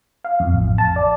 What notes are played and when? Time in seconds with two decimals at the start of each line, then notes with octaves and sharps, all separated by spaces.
0.25 F5
0.40 F2
0.53 A1
0.78 A5
0.96 D5